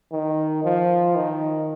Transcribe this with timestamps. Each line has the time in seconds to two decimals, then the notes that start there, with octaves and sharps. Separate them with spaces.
0.12 D#3
0.64 F3
1.15 D#3